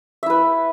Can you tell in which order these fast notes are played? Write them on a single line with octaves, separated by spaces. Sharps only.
E5 E4 B4